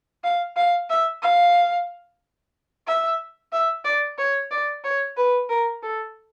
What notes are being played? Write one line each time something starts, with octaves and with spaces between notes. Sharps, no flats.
F5
F5
E5
F5
E5
E5
D5
C#5
D5
C#5
B4
A#4
A4